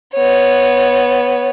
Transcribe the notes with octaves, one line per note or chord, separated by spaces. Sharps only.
B3 C#5